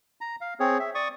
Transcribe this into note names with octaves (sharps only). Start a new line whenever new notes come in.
A#5
F5
C4 G#4 C#5
E5
D5 C#6 D#6